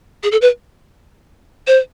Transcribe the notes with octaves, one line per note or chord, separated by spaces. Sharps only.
G#4
A4
B4
C5